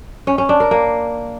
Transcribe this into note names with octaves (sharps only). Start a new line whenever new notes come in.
C#4
C#4
D4
A#4
A#3